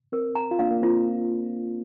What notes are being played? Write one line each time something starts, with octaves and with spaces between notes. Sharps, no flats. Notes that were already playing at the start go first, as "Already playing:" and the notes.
C4 A#4
A#5
F4
A#3 D4 F5
A#3
C4 F4